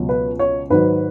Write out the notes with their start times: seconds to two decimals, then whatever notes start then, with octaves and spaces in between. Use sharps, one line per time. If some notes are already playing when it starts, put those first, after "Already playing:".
Already playing: C#2 B2 F#3
0.09 B4
0.39 C#5
0.70 G#2 D#3 F#3 B4